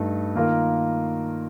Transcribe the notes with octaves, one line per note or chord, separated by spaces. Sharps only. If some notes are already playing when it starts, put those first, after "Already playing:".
Already playing: G2 A3 D#4
D#3 A#3 F4 A#4